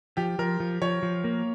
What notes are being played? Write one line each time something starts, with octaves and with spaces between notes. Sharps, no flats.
F3 G4
F3 A#4
F3
F3 C#5
F3
A#3